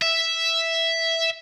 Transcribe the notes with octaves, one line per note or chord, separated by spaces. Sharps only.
E5